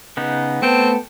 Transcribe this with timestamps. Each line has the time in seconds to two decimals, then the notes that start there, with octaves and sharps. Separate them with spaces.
0.17 C#3 B3 D#4
0.62 A3 B3 C4 G5 A5